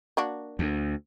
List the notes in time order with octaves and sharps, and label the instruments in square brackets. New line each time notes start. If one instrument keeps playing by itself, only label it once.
[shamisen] A#3 D4 F#4
[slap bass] D2